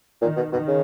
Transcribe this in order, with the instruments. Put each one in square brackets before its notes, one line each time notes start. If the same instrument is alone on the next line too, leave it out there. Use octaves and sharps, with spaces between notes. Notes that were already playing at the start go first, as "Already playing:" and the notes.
[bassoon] A#2 [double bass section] D#3
[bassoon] B2
[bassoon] B2 [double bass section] D#3
[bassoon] C#3